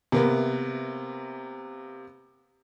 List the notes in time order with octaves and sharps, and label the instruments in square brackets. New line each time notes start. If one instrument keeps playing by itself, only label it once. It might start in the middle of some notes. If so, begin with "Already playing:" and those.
[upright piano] C3 A#3 B3